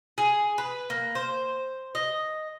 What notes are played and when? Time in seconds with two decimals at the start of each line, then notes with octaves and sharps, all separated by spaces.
0.18 G#4
0.58 B4
0.90 A#3
1.15 C5
1.95 D#5